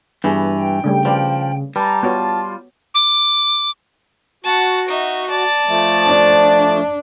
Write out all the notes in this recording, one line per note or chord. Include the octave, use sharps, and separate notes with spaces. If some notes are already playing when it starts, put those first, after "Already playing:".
G2 E3 B3 G#4
G5
C#3 G3 A3 D4
F3 B4 D5 F5
G3 B4 A5 A#5
B3 F4 F#4 C#5
D6
F#4 F#5 A5
D#4 E5
D5 A5
F3 A3
D4